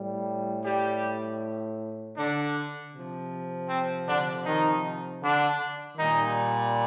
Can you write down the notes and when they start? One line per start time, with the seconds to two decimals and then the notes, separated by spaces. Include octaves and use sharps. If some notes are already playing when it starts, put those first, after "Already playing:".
Already playing: A2 G3
0.65 G3 G4
2.17 D3 D4
2.93 C3 F3
3.69 C4
4.07 D3 D4
4.46 D#3 D#4
5.22 D3 D4
5.98 A#2 D#3 G3 D#4